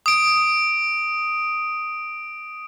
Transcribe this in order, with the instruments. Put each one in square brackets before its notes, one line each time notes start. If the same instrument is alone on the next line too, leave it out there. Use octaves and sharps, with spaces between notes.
[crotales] D#6 D7